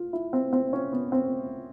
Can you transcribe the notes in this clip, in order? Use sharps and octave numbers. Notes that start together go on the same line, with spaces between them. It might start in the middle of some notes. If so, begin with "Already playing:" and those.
Already playing: F4
E4
C4
C4
C#4
B3
C4